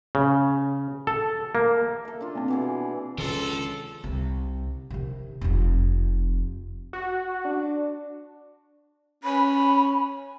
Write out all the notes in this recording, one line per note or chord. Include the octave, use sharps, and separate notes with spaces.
C#3
A4
A#3
A4 E5
D4 F4
A#3 C4
B2 E3 G#4
C#2 C3 D#3 F3 D4 A4 C6
C2
C3 D#3
F1 F2
F#4
D4
C#4 B5